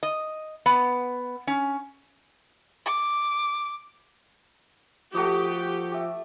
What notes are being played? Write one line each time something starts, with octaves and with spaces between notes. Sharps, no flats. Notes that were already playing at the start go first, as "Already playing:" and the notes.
D#5
B3
C#4
D6
F3 A3 F#4 G4 D#6
G4 E5